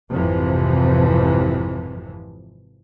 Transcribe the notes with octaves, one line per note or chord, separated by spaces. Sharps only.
G#1 F2 C3 E3 F3